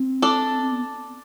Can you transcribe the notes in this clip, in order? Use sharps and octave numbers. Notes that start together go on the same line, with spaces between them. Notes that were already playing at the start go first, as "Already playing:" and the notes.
Already playing: C4
D4 A4 D5
C4
B3